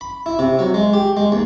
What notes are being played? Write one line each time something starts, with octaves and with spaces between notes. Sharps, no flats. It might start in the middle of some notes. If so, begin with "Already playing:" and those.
B5
E4
C3
F#3
G#3
G4
G#3
D#2